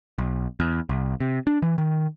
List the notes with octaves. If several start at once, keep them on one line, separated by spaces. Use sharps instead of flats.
B1
E2
C2
C3
D4
E3
D#3